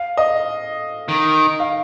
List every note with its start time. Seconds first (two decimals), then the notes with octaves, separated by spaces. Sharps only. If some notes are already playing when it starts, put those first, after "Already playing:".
Already playing: F5
0.17 D#5
1.08 D#3
1.60 F5